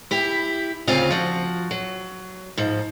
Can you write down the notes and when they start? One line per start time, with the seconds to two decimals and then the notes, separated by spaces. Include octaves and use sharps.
0.11 E4 G4
0.87 D2 C#3 C4 F4 F5
1.11 F3 F#4
1.71 F#3
2.57 G#2 F3